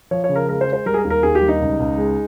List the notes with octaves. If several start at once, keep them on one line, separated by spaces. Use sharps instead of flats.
F3 C#5
C#5
C#3
A#4
G#3 A#4
C5
G#3
C5
G3 A#4
G#4
A#4
D#2
A#4
D#2 G#4
G4
G3
D#4
C#2
C#2
G#3